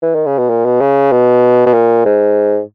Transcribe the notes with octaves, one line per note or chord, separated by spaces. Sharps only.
E3
D#3
C#3
B2
A#2
B2
C#3
B2
B2
A#2
G#2